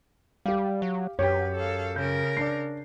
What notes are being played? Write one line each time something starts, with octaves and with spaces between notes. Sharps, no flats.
G3 G4 F5
F#3
F#2 G4 B4 C#5 G5
A4 F5
C#3 A#4 G6
D4 D5 C7